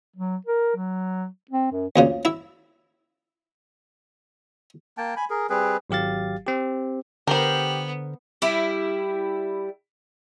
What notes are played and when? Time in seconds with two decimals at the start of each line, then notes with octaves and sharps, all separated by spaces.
0.16 F#3
0.46 A#4
0.76 F#3
1.51 C4
1.72 F#2
1.96 D2 A#2 C#3
2.25 E4 E5
4.98 A#3 G5 A5
5.17 G#5 B5
5.30 G#4 A#4
5.49 G3 C4 G#4 B4
5.90 G#1 F#3 G4 F5 A6
6.46 C4 G4
7.27 D3 B3 G4 A#4 C5
8.42 G3 E4